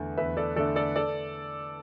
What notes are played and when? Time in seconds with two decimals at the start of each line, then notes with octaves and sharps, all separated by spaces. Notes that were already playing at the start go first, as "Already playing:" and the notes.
Already playing: E2 D3 A3
0.17 E2 B4 E5
0.37 A4 D5
0.56 D3 A3 A4 D5
0.76 A4 D5
0.96 A4 D5